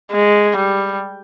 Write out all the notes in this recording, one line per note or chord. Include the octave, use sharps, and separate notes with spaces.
G#3
G3